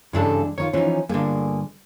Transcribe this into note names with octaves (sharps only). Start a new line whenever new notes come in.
G2 C#3 E3 G#3 D4 A4
D#3 D#4 F4 C#5
E3 F3 C#4 D#4
G2 D3 A#3 G#4